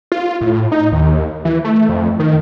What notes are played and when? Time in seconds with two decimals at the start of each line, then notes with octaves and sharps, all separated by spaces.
0.12 F4
0.41 A2
0.72 D#4
0.92 D#2
1.45 E3
1.64 A3
1.89 F2
2.19 D#3